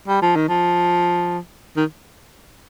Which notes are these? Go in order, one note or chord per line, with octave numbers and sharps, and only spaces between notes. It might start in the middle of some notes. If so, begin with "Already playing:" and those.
G3
F3
D#3
F3
D#3